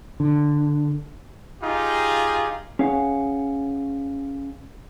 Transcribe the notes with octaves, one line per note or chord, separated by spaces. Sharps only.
D3
D#4 F4 G4 G#4
C#4 G#4 C#5 F5 F#5 G#5